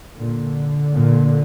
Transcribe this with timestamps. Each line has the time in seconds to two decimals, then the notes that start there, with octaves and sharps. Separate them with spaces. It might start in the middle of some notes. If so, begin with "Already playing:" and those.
0.16 A#2 D3
0.99 A#2